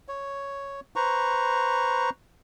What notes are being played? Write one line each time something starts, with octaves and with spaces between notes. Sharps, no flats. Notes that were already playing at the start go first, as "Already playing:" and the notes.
C#5
B4 C5 A#5 C#6